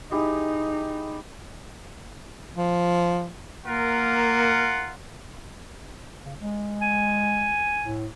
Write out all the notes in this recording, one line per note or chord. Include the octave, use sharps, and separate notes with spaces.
D#4 E4 G4 G#4
F3
A#3 F4 A#4 F#5
C#3
G#3
G#5
A2